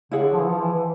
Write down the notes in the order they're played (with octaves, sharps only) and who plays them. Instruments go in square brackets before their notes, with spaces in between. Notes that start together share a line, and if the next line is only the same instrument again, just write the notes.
[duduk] C#3 [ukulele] E4 G#4 C#5 F#5
[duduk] D3
F3
E3
F3
E3
E3